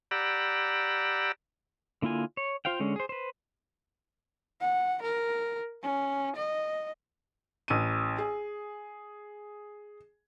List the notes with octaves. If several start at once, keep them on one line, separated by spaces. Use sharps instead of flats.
G4 D5 F#5 A#5 B5 E6
D3 A#3 E4 F4 G#5
C#5
F4 C5 F5 G5
D3 G#3 C#4
G#4 C5
B4 C5
F#5
A#4
C#4
D#5
A1 D#7
G#4